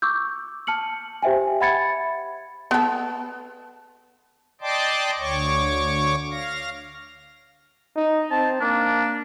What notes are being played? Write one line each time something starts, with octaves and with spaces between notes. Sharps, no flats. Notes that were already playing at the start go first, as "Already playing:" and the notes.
C#6 D6 E6 G6
A5 F6 C#7 F#7
G4 C5 E5 G5 G#5
E5 F#5 B5 G#6 A6 C#7
B3 A4
D5 D#5 G5 A5 C6 D6
D2 C#5 C#6 D6
F5 A#6
D#4
C4 A5
A#3 D4